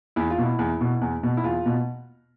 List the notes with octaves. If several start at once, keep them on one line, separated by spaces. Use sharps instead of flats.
E2 E4
F4
B2
E4
E2
B2
E2
B2
E4
E2 F4
B2